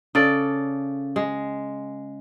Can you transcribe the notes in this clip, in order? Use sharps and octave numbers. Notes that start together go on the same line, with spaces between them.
C#3 A4 D5
G#3